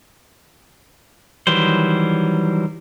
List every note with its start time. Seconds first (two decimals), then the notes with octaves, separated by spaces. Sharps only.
1.47 D#3 E3 F#3 G3 C5